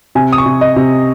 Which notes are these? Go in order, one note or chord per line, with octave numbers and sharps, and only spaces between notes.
C3 G#5
D#6
C#6
C3
D#5
C3